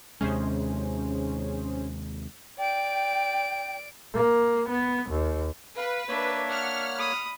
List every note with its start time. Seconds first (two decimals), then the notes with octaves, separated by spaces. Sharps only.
0.21 D#2 C3 G#3 C#4 G#4 C5
2.58 D5 G5 D7
4.14 A#3
4.69 B3
5.10 D#2
5.77 B4 F5
6.09 A#3 D4 C#5 E5
6.49 F#5 F6
6.97 B5 D#6